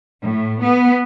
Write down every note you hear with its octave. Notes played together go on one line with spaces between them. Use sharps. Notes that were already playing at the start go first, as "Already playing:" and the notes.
A2
B3